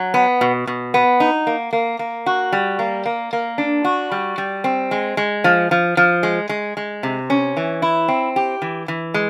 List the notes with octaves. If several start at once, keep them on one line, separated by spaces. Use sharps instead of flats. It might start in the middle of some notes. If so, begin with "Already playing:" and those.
Already playing: F#3
B3
B2
B2
B3
D#4
A#3
A#3
A#3
F#4
G3
A#3
A#3
A#3
D4
F#4
G3
G3
C4
G#3
G#3
F3
F3
F3
G#3
G#3
G#3
C3
C#4
E3
E4
C4
G4
E3
E3
G#3